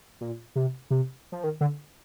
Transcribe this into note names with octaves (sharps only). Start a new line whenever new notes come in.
A#2
C3
C3
F3
D#3
D3